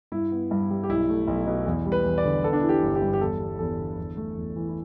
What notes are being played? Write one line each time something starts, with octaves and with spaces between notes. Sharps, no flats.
G2 E4
B3
G2
G3
G4
B1 E4
A3
B1
B2
E2
G3
B4
E2
D5
D3
B3 A4
D4
E3 E4
G4
G1
G4
G2
G4
E2 A4
G3
E2 A4
D3
E2
A3
E2
E3
E4